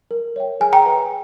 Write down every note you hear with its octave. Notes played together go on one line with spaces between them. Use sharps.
A#4
C#5 E5 G5
G#4 G#5
G5 A#5
B4 E5 G5